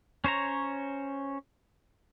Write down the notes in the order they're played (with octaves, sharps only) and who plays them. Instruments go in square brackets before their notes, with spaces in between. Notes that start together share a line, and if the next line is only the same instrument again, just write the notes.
[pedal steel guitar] C#4 C5 C#5 A#5